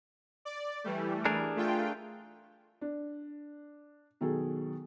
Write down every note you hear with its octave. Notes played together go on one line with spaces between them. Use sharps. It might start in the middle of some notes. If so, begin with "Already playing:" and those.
D5
E3 G3 A3
D4 G#4 A#4
A3 F4 G5
D4
B2 D#3 F#3 G#4 A4